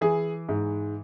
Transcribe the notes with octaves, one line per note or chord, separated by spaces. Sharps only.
E3 G#4
G#2